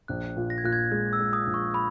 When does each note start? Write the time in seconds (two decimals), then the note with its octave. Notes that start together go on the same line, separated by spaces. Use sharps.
0.08 A#1 F#6
0.37 A#2
0.50 A#6
0.58 G#6
0.64 A#2 F#6
0.73 G#6
0.92 G#3 F#6
1.13 E6
1.20 G#3
1.33 D#6
1.47 A#1
1.54 C#6
1.74 B5